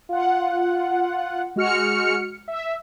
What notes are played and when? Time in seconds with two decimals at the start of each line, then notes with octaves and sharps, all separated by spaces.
0.09 F4 F#5
1.56 G#3 F#4 F6 C#7
2.48 E5